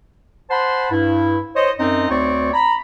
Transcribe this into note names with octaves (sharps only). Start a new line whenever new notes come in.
C5 F#5 A5 B5 C6
G2 E4
C5 C#5 D#5
F#2 C4 C#4 D#4 D#5
D2 C4 C#5 D5 C#6
A#5 B5